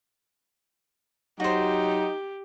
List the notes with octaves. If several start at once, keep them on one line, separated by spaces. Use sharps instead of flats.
F#3 D#4 F#4 G4 C5